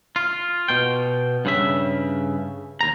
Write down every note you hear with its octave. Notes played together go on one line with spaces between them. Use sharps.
F4
B2 G5
G2 C#3 E5
D#2 A#5